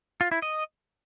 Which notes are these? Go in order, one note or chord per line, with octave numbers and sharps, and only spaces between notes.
F4
E4
D#5